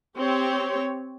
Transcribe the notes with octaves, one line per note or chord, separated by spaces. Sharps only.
C4 G4 C#5